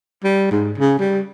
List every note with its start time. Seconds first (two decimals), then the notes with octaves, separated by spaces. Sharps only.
0.24 G3
0.51 G#2
0.78 C#3
0.99 G3